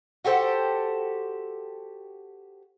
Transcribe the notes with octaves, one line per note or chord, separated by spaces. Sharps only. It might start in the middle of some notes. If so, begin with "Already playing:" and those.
F#4 G4 A4 C5